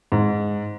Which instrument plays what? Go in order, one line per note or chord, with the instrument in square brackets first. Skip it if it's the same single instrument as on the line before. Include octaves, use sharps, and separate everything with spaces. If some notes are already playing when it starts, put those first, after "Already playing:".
[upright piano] G#2